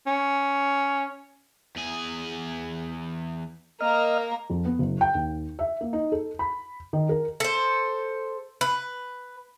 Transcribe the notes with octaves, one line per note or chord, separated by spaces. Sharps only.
C#4
E2 G#4
A#3 A#4 D#5 F6
F2
B3
F#1
G5
D#2
E5
A#3
D#4
A4
B5
D#3
A#4
A4 C5
B4